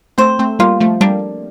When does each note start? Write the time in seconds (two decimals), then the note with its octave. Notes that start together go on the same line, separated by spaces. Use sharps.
0.18 A3 C4 C5
0.39 A3 C4
0.59 G3 A#3 F4
0.80 F3 A3
1.01 G3 A#3 D4